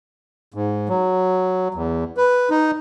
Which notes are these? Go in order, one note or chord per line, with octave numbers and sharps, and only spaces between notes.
G#2
F#3
E2
B4
D#4